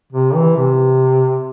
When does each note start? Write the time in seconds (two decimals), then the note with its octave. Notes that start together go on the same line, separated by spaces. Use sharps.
0.13 C3
0.35 E3
0.57 C3